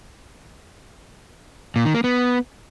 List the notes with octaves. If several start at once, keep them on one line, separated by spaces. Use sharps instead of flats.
A#2
D#3
A#3
B3